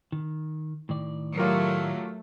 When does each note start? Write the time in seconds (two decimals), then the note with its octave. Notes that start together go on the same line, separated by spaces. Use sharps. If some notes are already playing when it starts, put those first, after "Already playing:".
0.12 D#3
0.89 A2 D#3 D5
1.37 F#3 A3 F4 G4 A#4